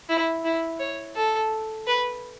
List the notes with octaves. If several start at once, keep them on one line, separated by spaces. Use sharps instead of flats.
E4
E4
C#5
A4
B4